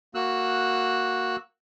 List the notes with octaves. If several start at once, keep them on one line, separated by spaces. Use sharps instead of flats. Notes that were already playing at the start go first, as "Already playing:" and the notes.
A#3 F#4 E6 F#6